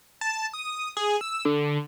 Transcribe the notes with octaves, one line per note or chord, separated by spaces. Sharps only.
A5
D#6
G#4
E6
D3